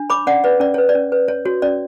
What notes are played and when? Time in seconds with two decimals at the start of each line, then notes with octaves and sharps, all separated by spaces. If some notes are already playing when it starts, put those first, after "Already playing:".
Already playing: D4
0.10 C#5 B5 D6
0.27 C#4 D5 F#5
0.44 B4 D5
0.60 C#4 D5
0.74 B4 C#5
0.89 D5
0.95 C#4
1.12 B4
1.28 C#5
1.45 F#4 C#5
1.62 C#4 D5